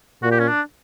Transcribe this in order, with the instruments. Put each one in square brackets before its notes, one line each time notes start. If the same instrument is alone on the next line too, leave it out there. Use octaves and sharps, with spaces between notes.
[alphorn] A#2 [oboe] F#4
[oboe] G4
C#4
D4